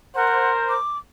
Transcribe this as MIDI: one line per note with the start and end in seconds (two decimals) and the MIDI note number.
0.15 0.76 70
0.15 0.76 72
0.15 0.51 78
0.69 0.98 86